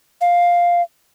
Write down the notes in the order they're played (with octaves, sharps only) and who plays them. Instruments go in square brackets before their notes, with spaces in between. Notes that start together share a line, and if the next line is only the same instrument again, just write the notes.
[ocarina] F5